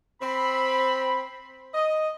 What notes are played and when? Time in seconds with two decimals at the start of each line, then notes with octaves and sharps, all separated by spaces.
0.22 C4 B5
1.75 D#5